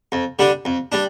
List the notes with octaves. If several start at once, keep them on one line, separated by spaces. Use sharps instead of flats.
F2
D3 G3 D4
F2
G3 D4